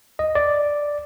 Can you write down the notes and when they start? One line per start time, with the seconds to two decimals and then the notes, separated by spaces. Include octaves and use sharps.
0.19 D#5
0.35 D5